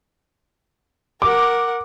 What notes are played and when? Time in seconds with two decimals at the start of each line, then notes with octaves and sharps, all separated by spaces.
1.22 A#4 F#5 D6